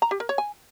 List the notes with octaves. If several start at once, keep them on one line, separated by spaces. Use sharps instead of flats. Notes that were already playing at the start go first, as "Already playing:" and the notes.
A#5
G4
A#4
C#5
G#5